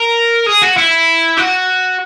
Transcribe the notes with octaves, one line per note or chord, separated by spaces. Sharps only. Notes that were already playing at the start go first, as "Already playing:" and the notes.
Already playing: A#4
G#4
F#4
E4
F#4